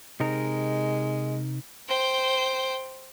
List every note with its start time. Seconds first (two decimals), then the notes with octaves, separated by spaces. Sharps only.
0.20 C3 G#3 D#4 A#4
1.88 C5 G5